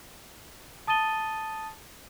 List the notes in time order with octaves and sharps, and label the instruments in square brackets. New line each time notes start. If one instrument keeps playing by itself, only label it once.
[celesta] A5 D#6 A6 D#7 G7